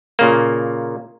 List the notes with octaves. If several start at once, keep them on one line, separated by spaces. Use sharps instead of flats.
A#2 C#3 A#3